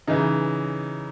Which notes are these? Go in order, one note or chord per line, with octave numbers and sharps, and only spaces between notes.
C#3 E3 D#4